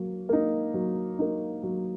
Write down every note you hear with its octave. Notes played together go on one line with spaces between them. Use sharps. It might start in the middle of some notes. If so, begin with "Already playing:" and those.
Already playing: F#3 A#3
A#3 D#4
F#3
A#3 D#4
F#3